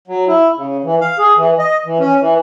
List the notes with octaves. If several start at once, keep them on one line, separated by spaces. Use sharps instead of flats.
F#3
E4
C#3
E3
F5
G#4
E3
D#5
E3
C#4
E3